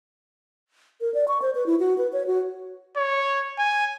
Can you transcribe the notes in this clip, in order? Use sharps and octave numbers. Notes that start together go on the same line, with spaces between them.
A#4
D5
C#6
C5
B4
E4
F#4
B4
C#5
F#4
C#5
G#5